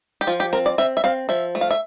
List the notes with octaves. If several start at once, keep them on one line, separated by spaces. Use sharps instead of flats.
G4
F3 F4
G4
C4 A#4
D5
C4 E5
E5
C4 F5
F3 E5
A3
F5
E5